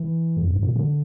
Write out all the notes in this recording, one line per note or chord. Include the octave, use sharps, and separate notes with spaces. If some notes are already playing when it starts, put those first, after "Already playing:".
Already playing: E3
F2
G2
A#2
D3